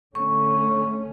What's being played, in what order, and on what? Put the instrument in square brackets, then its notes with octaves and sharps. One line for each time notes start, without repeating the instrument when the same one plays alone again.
[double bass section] D3 A3 C#4 [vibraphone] C#6